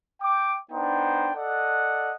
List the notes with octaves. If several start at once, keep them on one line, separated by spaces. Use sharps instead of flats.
G5 D6
B3 D4 D#4 C5 G5
A4 D5 D#5 F#5